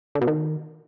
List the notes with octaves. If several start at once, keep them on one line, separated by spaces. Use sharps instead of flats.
D3
B2
D#3